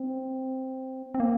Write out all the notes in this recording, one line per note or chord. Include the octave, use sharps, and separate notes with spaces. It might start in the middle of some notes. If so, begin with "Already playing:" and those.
Already playing: C4
C4
A#3